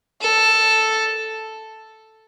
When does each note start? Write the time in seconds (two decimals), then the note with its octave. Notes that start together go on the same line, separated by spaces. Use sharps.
0.21 A4